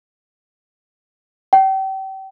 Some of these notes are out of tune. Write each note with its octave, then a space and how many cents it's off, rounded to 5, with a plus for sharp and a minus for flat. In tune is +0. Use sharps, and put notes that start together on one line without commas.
G5 -35